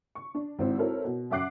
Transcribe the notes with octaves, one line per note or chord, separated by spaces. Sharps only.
C#6
D4
G#1 C4 E4
C4 E4 F#4 A4 A#4 C#5
B2
F#2 E5 F#5 D6 F#6 C7